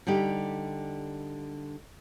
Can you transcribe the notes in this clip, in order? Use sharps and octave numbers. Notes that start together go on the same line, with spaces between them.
D3 G3 D#4 G4